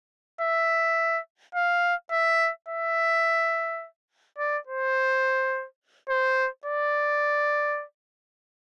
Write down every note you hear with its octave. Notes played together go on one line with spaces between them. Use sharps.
E5
F5
E5
E5
D5
C5
C5
D5